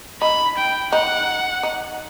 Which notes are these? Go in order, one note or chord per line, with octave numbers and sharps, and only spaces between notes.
D#4 B5
G5
D#4 F#5
D#4